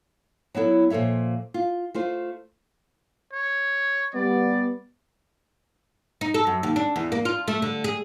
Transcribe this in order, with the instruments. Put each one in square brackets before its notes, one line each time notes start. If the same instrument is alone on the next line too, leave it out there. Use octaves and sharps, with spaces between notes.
[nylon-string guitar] F#3 B3 E4 A4
A#2 F3 A4 C#5 E5
F4
A3 F4 C5
[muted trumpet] C#5
[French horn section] G3 B3 [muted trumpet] D5
[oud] D#4
A4
F#2
D#2
D4
E2
A#3
F4
A3
D3
G#4